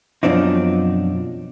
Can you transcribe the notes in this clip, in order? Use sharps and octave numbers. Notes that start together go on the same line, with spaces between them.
F#2 B2 F3 C4 D4 D#4